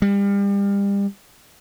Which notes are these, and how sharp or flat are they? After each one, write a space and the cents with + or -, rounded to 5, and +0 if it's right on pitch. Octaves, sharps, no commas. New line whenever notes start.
G3 +35